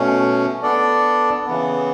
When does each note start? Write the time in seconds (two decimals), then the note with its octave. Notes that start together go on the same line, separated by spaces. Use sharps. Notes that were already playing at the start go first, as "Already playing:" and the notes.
Already playing: B2 A3 C#4
0.63 B3 D4 A4 D5
1.46 C#3 E3 B3